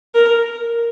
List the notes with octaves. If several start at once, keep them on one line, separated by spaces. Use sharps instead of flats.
A#4